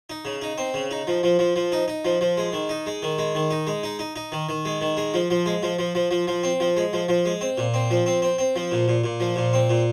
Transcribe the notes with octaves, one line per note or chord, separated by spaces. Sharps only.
D#4
C#3
D#4
C4
C#3
D#4
F3
F3
F3
F3
D#4
D#4
F3
F3
G#3
D#3
D#4
G#3
D#3
G#3
D#3
D#4
G#3
D#4
D#4
D#4
D#3
D#3
G#3
D#3
G#3
F3
F3
G#3
F3
F3
F3
F3
F3
C4
F3
G#3
F3
F3
G#3
C4
A#2
C4
F3
C4
C4
C4
F3
A#2
A#2
A#2
F3
A#2
C4
A#2